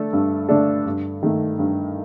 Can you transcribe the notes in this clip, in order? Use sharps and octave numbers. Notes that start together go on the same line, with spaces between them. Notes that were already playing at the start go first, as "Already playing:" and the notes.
Already playing: D3 A3 D4 A4
G2
D3 A3 D4 A4
G2
D#3 A3
G2